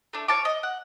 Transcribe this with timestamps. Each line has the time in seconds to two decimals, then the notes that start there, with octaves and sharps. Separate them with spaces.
0.13 A3 D4
0.28 C#5 F5 A5 D6
0.45 D#5
0.63 F#5